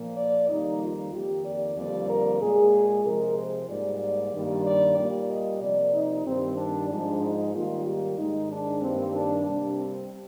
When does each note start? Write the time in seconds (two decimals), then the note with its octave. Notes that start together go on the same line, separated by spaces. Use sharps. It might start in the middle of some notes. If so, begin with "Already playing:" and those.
Already playing: A#2 F3 A#3
0.17 D5
0.49 F2 D#3 G3 A#3 D#4
0.81 F4
1.13 F2 D#3 A#3 G4
1.45 D5
1.77 F2 D3 G3 A#3 D5
2.09 A#4
2.41 A#2 G#3 G#4
3.05 C3 F3 G#3 A#4
3.37 C5
3.69 G#2 G3 A#3 D5
4.33 G2 D#3 G3 A#3
4.65 D5
4.97 A#2 G3 A#3 D5
5.30 D#5
5.61 C3 F3 A#3 D5
5.94 D#4
6.25 G2 D#3 G3 C4
6.57 D4
6.89 G#2 F3 G#3 D4
7.21 D#4
7.53 G#2 D#3 G3 A#3 F4
7.85 G4
8.17 G#2 D#3 G#3 D#4
8.49 D4
8.81 G2 D#3 G3 A#3 C4
9.14 D4
9.45 C3 G3 A#3 D4
9.77 C4